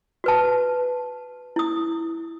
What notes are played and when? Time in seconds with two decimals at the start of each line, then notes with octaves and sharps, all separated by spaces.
0.24 F#4 B4 A5
1.56 E4 D#6